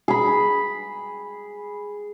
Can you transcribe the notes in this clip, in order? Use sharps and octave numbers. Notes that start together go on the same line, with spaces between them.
G#4 B5